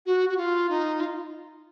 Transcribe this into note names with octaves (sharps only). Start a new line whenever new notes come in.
F#4
F#4
F4
D#4
F4